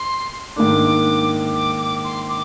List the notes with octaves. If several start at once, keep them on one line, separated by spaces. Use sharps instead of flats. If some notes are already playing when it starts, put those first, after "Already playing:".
Already playing: C6
G#2 D#3 A#3 D4 D6
D6
D6
C6
D6